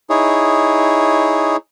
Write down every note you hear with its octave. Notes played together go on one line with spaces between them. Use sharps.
D#4 E4 G#4 C#5